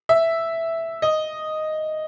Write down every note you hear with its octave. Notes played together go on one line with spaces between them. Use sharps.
E5
D#5